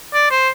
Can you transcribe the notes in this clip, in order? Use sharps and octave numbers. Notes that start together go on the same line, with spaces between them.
D5
C5